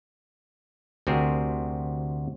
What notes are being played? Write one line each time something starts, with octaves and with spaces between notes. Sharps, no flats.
D2 C3 C4 F#4 G#4 A#4